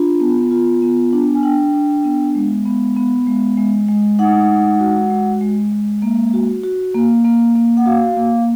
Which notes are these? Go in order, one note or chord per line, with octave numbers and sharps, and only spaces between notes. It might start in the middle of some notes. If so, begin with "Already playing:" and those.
Already playing: D4 F4
B3
F4
B3
D4
G#5
D4 G5
D4
B3
G#3
B3
B3
G#3
G#3
G#3
D#4 F#5
G#3
F#4
G#3
G#3
G#3
A#3
F#4
F#4
A#3
A#3
A#3
F#5
F#4 F5
A#3